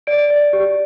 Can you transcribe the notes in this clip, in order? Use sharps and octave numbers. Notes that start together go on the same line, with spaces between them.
D5 D7
D5
G4